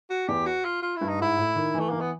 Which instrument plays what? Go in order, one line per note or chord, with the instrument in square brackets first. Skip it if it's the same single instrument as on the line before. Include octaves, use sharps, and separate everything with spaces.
[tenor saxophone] F#4
[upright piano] E2 [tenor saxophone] G4
[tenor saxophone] F#4
F4
F4
E4
[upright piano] G2
[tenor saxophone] D#4
[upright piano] G#2 [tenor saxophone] E4
[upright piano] A2
D#3
E3
[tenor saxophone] A3
[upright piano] E3 [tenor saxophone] A#3
[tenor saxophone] B3